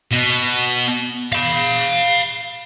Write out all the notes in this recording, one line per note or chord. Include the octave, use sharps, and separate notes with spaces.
B2
F5 B5